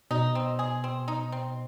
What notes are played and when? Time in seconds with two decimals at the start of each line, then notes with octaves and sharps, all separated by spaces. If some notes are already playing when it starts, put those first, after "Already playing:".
0.11 B2 D#4
0.35 C4
0.59 G#4
0.84 C4
1.08 D#4
1.32 C4